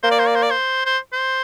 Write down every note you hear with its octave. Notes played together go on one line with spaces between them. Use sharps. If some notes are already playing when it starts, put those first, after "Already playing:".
A#3 C5
D5
C5
D5
C5
D5
C5
C5
C5